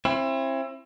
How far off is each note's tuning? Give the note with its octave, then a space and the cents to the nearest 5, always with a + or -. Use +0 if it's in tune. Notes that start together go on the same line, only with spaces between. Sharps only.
C4 +35 E4 +25